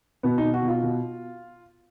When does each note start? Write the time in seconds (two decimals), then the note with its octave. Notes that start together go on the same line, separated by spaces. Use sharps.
0.23 B2 B3
0.38 D#4
0.44 B2
0.54 F#4
0.62 B2
0.68 F4
0.83 B2